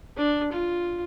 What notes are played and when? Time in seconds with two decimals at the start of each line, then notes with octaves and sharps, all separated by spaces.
0.17 D4
0.52 F4